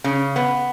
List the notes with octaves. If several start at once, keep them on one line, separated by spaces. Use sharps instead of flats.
C#3
B3